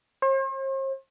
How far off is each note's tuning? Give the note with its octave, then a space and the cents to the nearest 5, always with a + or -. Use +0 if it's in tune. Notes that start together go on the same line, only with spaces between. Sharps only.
C5 +45